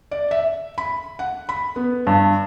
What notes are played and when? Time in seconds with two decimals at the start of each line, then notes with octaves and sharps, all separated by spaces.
0.11 D5
0.31 E5
0.78 B5
1.19 F#5
1.49 B5
1.76 B3
2.07 G2